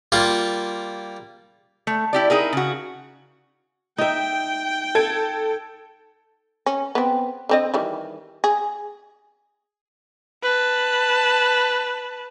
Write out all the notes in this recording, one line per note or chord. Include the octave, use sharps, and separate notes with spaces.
G3 A#3 F4
A3
E4 G4 D5
D#4 E4 G#4 A#4
C#3 F#4
D#4 E5 G5
A4 G#6 D7
C#4
B3 C4
D3 C4 D#5
D#3 E3 G3
G#4
B4 A5